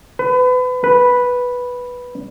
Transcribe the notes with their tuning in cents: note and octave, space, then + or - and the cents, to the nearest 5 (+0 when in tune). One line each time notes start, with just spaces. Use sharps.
B4 +30
B4 -5